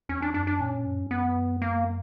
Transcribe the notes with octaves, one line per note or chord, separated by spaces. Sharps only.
E2 C#4
D4
F#2 D4
D4
A#2 C#4
F#2
G2
F#2 B3
A#3